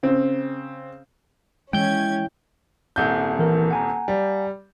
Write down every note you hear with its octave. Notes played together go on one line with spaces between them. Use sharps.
C#3 C4
E3 G#3 C#4 G5 G6 G#6
D#1 C2 G6
E3 A#4
F#5 G#5 A#5
G3